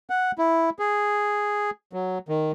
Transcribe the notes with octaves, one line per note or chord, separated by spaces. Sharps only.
F#5
E4
G#4
F#3
D#3